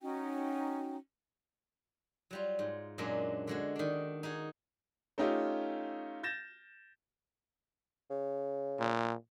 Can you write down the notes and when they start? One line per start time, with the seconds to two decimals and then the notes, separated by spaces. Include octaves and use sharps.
0.01 C#4 D#4 F#4 G5
2.31 F#3 G3 F4
2.59 G#2
2.98 F#2 A#2 G#3 A#3 C#4 D4
3.47 D3 G#3 F#4
3.76 D#3 D4
4.23 D#4 F#4 G#4
5.18 A3 C#4 D#4 F4 G4
6.23 G6 A6 A#6 E7
8.10 C#3
8.79 A#2